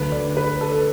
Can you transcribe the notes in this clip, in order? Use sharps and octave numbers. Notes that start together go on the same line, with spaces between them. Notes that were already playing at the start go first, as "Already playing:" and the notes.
Already playing: D2 D3 F#3 B4
D5
B4
A4